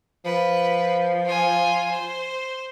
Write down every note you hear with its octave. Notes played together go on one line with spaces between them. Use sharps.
F3 B4
F4 G#5
C5